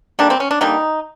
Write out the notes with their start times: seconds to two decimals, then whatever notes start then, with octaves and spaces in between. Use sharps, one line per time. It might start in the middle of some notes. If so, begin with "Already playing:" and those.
0.19 D3 G3 A#3 D4
0.30 C4
0.40 C#4
0.51 D4
0.61 D3 G3 A#3 D#4